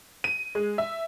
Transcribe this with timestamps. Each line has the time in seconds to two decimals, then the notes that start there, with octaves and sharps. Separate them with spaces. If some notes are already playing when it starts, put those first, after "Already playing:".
0.24 D#7
0.55 G#3
0.78 E5